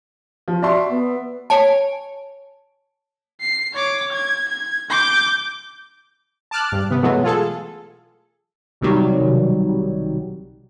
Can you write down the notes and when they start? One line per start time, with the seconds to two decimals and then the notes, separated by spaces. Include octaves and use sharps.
0.48 F3
0.62 F#4 D5 E5 C6
0.89 B3
1.50 C#5 G#5 A5 D7
3.41 C7
3.74 C#5 D6
4.12 G#6
4.49 G#6
4.90 D6 G6
6.51 A5 D6 F6 F#6
6.72 G2
6.90 C3 B3
7.03 B2 E3 F#3 G#3 A3 B3
7.24 F4 G#4 A4
8.81 B1 C3 D#3 F#3 G3